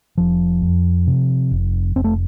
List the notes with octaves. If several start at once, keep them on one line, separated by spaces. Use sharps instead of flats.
F1 F3
F2
C3
F1
F1 C4
A3